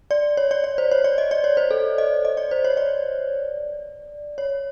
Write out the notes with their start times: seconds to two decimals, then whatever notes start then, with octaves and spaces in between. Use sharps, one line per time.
0.11 D5
0.37 C#5
0.51 D5
0.64 D5
0.78 C5
0.91 C#5
1.04 D5
1.18 D#5
1.31 D5
1.44 C#5
1.57 C5
1.71 A4
1.98 D#5
2.25 D#5
2.37 D5
2.51 C5
2.64 C#5
2.77 D5
4.38 C#5